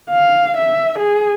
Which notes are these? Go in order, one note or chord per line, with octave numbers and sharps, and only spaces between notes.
F5
E5
G#4